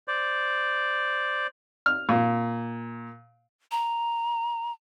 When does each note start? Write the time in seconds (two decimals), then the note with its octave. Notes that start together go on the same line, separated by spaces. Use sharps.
0.08 C5 D5
1.86 F6
2.09 A#2
3.71 A#5